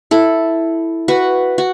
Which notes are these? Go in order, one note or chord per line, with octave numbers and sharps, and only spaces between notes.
E4 A4
F#4 B4
F#4